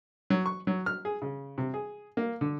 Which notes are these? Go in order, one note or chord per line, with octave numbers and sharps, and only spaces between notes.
F#3
C#6
F#3
F6
G#4
C#3
C3
G#4
A#3
D3